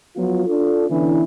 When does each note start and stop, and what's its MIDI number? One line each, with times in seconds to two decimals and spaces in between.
0.17 0.42 53
0.17 0.42 54
0.17 0.42 59
0.17 0.42 65
0.46 0.88 62
0.46 0.88 65
0.46 0.88 69
0.90 1.23 50
0.90 1.23 52
0.90 1.23 59
0.90 1.23 61
0.90 1.23 62
0.90 1.23 64